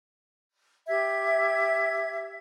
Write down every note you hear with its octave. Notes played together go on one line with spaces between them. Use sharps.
G4 E5 G#6